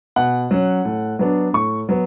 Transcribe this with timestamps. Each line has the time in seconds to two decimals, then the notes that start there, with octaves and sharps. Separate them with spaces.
0.16 B2 F#5
0.51 F#3 C#4
0.85 A2
1.19 F#3 B3 D4
1.53 A2 C#6
1.89 F#3 B3